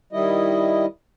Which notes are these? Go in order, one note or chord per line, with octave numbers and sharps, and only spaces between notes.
D#3 G3 E4 D#5